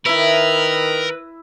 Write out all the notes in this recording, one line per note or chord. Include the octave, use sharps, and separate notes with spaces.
D#3 E4 A#4 B4 E5